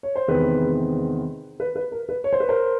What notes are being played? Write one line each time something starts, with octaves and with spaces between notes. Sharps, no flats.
C#5
C5
E2 C3 D#3 G#3 C4 B4
B4
B4
A#4
B4
C#5
C5
B4
A#4 C5